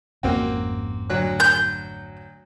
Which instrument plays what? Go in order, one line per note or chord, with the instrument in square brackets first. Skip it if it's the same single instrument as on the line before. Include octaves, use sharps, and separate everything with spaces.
[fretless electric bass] G#1 F2 C#4 [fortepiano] A#3 C4 F#4
[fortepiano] D2 F#3 F#6
[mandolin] G6